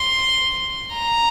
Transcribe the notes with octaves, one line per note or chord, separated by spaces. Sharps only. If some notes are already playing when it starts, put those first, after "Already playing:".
Already playing: C6
A#5